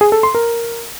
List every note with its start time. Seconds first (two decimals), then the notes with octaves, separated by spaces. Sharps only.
0.01 G#4
0.12 A4
0.23 C6
0.35 A#4